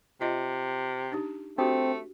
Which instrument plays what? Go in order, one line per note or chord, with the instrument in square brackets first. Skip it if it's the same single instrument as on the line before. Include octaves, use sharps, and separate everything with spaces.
[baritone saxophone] C3 [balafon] F4 D#5
[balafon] D4 D#4 G4
[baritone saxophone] A3 [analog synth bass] C4 [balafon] D4 F#4 G4